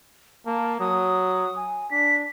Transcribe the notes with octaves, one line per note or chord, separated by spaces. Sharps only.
A#3 A5
F#3 D#6
G#5
D4 B6